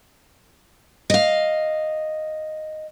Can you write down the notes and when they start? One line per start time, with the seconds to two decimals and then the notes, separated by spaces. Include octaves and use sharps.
1.10 D#5 F5